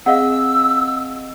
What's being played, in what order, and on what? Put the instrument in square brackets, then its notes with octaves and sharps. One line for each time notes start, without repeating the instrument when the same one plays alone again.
[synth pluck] C4 G#4 D#5 [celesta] F5 F#5 [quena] E6